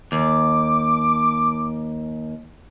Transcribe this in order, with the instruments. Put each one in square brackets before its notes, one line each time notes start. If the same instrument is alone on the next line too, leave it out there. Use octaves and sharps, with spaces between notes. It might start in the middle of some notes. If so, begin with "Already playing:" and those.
[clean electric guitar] D#2 [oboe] D6